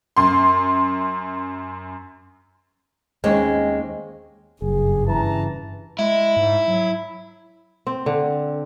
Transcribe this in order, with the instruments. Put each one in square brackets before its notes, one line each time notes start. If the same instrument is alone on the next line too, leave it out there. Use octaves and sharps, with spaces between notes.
[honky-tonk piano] F#2 C6
[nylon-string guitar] D#2 G#3 C4 C#4
[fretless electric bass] F#1 [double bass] G2 [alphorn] G#4
[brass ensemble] C#3 A5 A#5 [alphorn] E3
[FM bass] G#3 [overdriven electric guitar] E4
[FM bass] G#2
F#3
[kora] C4
D3